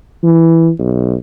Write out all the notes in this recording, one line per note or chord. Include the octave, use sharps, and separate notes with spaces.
E3
B1